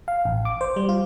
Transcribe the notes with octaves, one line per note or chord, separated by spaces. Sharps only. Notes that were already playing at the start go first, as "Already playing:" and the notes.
F5
A1
D6
C5
G3
F4